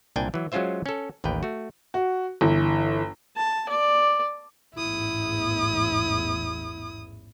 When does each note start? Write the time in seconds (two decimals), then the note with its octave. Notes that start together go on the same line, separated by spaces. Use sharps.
0.16 C2 A#2 D4 G5 G#5
0.34 E3 F#3
0.52 F#3 G#3 C#4 F4 C5 E5
0.86 C#4 A4
1.24 A1 D#2 A#4 B4 G5
1.43 A3 F#4
1.94 F#4
2.41 G1 E3
3.37 A5
3.69 D5
4.74 A1 E2 G#2 E4 D#6